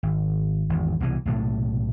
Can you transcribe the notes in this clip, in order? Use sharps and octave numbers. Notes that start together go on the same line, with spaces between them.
G#1
G#1 E2
C2 B2 E3
B1 A2 C3 A3